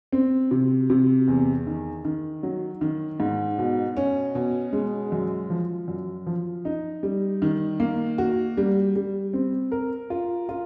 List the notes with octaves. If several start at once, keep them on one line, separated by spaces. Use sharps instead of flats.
C4
C3
C3
E2
D#3
D#3
F#3
D#3
G#2
B2
C#4
B2
G#3
F#2
F3
F#2
F3
D#4
G3
D#3
A#3
F#4
G3
G3
C4
A#4
F4
F4